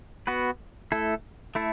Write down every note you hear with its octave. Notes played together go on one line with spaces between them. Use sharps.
B3 F#4 B4
A3 E4 A4
A3 E4 A4